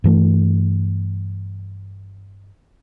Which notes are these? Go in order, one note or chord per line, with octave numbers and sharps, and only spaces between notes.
G2 E3 A3